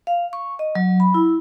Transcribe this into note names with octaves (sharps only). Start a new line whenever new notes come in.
F5
C#6
D#5
F#3
B5
E4